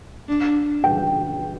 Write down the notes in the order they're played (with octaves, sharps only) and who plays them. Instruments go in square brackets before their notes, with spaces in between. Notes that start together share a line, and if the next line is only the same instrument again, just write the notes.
[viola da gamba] D4
[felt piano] G5